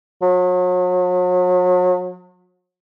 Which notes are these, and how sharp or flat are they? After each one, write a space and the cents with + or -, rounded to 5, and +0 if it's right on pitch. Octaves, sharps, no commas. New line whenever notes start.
F#3 -40